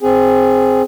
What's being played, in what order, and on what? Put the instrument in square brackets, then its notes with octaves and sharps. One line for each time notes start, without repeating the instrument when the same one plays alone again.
[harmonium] C4 G#4